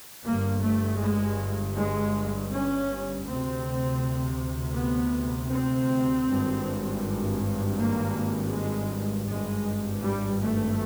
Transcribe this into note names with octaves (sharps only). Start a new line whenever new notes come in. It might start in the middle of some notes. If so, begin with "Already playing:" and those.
G1 G2 A#3
A3
G#3
G#3
C#4
D2 C3 C4
B3
C4
G#1 G2
A#3
G#3
G#1 G2 G#3
G3
A3